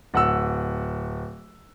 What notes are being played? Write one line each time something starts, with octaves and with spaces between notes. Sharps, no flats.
D1 F#5 E6